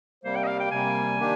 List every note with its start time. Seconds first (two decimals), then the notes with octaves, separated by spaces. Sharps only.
0.24 C3 G3 A#3 C5
0.36 G5
0.44 D#5
0.48 F5
0.60 G5
0.71 C3 G3 A#3 G#5
1.19 D#3 A#3 D4 G4